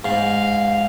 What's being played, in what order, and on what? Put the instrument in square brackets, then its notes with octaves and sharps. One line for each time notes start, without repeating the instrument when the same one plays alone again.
[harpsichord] G#2 [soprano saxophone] F5